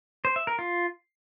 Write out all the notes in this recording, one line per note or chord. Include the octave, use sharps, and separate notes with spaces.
C5
E5
A#4
F4